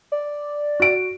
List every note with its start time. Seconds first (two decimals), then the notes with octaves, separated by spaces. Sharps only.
0.12 D5
0.80 F#4 D7